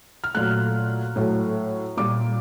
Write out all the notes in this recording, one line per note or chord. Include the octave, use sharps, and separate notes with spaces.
F6
A#2 F#3 A3 F#6
A2 F#3 A3
A#2 G3 D6